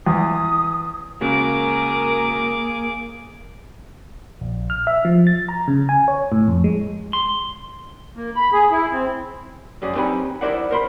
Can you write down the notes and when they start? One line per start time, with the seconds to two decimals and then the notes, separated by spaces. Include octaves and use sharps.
0.06 E2 D#6
1.21 C#3 G#3 A#3 F#4 G#4 A#4 D6
4.41 A#1
4.70 F6
4.87 E5
5.05 F3
5.27 A6
5.49 A#5
5.68 C#3
5.89 G#5
6.08 C#5
6.32 A2
6.48 F2
6.64 G#3
7.13 C6
8.16 A#3
8.36 B5
8.52 G#4
8.71 E4
8.92 C4
9.82 F#2 C#4 G#4 D5
9.95 C4 D#4 G4 B4 G#5 B5
10.41 E4 A#4 C5 D5 E5 F#5
10.71 A#4 C5 B5